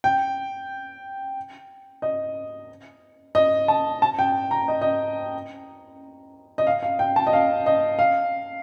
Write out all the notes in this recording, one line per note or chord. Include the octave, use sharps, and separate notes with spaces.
G5
D#5
D#5
A5
A5
G5
A#5
D#5
D#5
D#5
F5
F5
G5
A5
D#5
F5
D#5
F5